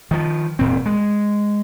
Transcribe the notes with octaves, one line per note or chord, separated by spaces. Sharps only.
D#3 F3
E1 A#2 C4
G#3